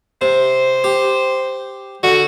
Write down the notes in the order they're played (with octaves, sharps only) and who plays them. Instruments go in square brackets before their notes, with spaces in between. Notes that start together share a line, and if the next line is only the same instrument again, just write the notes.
[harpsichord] C3 [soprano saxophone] C5
[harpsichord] G4
[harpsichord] D3 [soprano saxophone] F#4